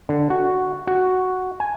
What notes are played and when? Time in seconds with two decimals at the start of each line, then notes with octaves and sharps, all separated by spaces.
0.09 D3
0.30 F#4
0.87 F#4
1.60 G#5